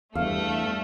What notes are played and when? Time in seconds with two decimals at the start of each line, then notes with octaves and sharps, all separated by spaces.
0.15 E2 G2 A3 F5